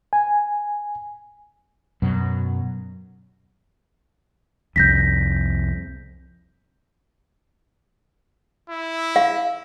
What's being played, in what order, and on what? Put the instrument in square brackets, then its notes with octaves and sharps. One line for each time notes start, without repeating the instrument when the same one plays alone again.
[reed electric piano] G#5
[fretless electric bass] F#2 B2 F#3
[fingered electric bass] C2 F2 [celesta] G6 A#6 B6
[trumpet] E4
[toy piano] F5